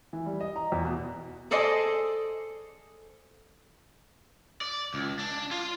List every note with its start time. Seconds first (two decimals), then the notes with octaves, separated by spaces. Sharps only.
0.13 E3
0.26 G3
0.40 D#5
0.56 A#5
0.72 E2
0.85 B2
1.51 G#4 A4 C5 D5 D#5 G#5
4.61 D5
4.94 C#2
5.19 D4
5.51 F4